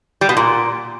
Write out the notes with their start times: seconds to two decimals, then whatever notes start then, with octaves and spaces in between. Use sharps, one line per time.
0.21 G3
0.29 B2
0.37 A#2